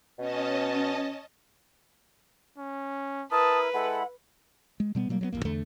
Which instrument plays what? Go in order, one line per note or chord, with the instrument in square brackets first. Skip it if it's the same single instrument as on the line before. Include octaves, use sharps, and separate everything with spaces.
[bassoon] B2 [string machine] C#4 D#5 A5
[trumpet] C#4
[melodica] E4 A#4 [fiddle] B4 [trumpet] A5 [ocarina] D#6
[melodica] G#3 E4 B5 [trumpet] A4 [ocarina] F#5
[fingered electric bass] G#3
B2 G3 B3
B2 F#3 G3 A#3
F#3 G3 B3
D#1 A1 E2 A#3
E2 D3 A3